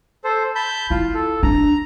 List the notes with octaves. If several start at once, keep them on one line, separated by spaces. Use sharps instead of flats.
A4 C5
A5 B5 G6
E4 F4
A4
D4 A#5